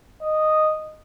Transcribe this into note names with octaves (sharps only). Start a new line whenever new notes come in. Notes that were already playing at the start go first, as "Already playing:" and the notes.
D#5